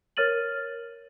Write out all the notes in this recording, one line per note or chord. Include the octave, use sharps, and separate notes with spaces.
A#4 C#5 F6 A6 D#7 F#7